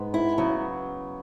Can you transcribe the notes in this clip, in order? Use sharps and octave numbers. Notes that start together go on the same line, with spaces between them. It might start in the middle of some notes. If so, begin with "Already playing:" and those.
Already playing: G#2 G#3 B3
E4
C#3 F#3 B3